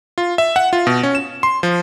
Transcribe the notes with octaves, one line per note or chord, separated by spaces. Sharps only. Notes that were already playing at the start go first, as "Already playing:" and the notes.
F4
E5
F#5
F4
B2
C#4
E7
C6
F3